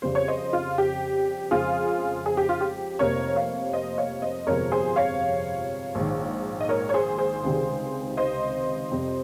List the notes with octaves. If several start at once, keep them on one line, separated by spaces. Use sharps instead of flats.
F2 C#3 G3 C5
C#5
C5 D#5
F4
G4
F2 C#3 F3 G#3 F4 G#4
G#4
G4
F4
G4
F1 F2 C3 G3 A#3 A#4 C#5
C#5 F5
C5 D#5
C#5 F5
C5 D#5
G1 F2 C3 F3 G#3 A#4 C#5
G#4 C5
C#5 F5
A#1 G#2 D#3
D#5
A#4 C#5
C#5
G#4 C5
G#4 C5
C#2 C3 D#3 G3 C4
C5 D#5
F2 C3 G3 C4